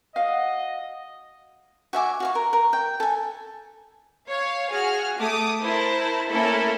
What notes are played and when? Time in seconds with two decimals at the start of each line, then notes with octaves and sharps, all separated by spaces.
0.16 F#4 D#5 F5 F#5
1.93 F#4 E5 G#5 D6
2.20 F#4 F5 C#6
2.35 A#4
2.53 A#4
2.73 G5
3.00 A4 G#5
4.28 C#5 F5
4.71 F#4 G#4 G#5 F6
5.18 A3 D6 D#6
5.62 E4 A#4 C5 A5
6.30 A3 A#3 C#4 E4 A4 A#4